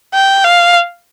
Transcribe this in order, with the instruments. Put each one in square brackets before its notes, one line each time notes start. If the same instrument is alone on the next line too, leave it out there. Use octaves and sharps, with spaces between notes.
[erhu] G5
F5